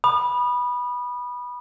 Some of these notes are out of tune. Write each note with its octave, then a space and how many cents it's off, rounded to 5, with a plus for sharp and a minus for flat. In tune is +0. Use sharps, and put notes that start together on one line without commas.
B5 -15 D#6 -35